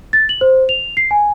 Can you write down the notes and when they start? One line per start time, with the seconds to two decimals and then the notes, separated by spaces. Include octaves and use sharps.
0.13 A6
0.29 F#7
0.41 C5
0.69 F7
0.97 C7
1.11 G#5